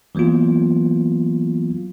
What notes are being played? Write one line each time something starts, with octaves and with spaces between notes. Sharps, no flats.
E3 F#3 A#3 B3 F4